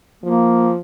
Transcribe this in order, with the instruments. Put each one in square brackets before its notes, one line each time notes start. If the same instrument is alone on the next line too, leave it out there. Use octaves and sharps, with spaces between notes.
[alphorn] F3 [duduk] A#3